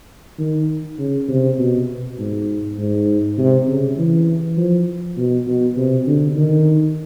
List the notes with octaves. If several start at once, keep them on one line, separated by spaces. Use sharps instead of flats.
D#3
C#3
C3
B2
G#2
G#2
C3
C#3
E3
F3
B2
B2
C3
D3
D#3